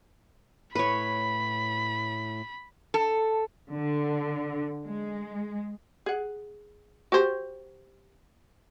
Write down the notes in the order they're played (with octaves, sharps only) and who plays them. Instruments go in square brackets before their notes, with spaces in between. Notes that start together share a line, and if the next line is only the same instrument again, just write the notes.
[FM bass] A2 [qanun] B4 C#5 [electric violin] B5
[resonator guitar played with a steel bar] A4
[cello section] D3
G#3
[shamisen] G#4 F#5
F#4 G4 C5